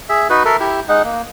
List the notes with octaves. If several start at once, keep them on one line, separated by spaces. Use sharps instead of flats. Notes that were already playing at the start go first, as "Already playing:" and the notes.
G#4 E5
D#4 F#4 B4
A4 A#4 E5
E4 G4
G#3 D#4 F#5
A#3